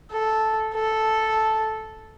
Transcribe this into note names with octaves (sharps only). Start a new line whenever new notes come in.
A4
A4